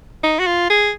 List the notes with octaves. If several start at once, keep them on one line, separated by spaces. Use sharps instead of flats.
D#4
F#4
F4
G#4